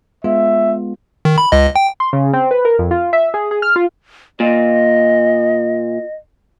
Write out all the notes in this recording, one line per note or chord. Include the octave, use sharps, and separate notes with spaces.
G#3 B3 F4 E5
D#3
B5
C#2 D#5
G5
C6
C#3
C4
B4
A#4
F2
F4
E5
G#4
G#4
F6
F4
A#2 D#5